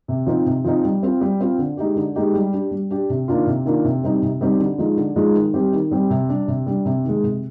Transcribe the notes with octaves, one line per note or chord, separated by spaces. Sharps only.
C3
F3 C4 D#4
C3
F3 C4 D#4
G3
C4 F4
G3
C4 F4
D3
G#3 D#4 G4
D3
G#3 D#4 G4
G3
D4 G4
G3
D4 G4
C3
D#3 A#3 D4 F4
C3
D#3 A#3 D4 F4
C3
G3 C4 D#4 G4
C3
G3 C4 D#4 G4
D3
F3 G#3 D#4
D3
F3 G#3 D#4
D#3
G3 C4 G4
D#3
G3 C4 G4
C3
G3 D4
C3
G3 D4
C3
D#3 G#3
C3